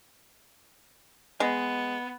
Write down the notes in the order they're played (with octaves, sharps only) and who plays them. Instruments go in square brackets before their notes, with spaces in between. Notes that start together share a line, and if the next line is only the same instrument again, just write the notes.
[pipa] G#3 [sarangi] B3